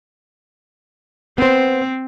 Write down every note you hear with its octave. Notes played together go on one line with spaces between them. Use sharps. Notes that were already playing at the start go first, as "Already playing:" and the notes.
B3 C4 C5